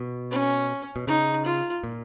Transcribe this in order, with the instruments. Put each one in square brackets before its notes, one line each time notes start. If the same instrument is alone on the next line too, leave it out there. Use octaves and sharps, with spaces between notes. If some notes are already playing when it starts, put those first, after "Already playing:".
Already playing: [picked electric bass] B2
[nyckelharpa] C#4
[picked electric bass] B2
[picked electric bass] C#3 [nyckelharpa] D#4
[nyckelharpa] F4
[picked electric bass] A#2